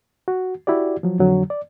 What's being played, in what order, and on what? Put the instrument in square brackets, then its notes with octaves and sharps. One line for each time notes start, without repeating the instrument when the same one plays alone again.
[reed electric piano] F#4
E4 F#4 G4 D5
F3 F#3
F2 D3 F#3
D5